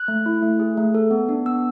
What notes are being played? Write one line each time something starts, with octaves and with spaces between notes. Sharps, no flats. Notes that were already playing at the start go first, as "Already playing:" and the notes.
Already playing: F#6
A3
E4
A3
G#4
A3
A4
B3
D4
B3 E6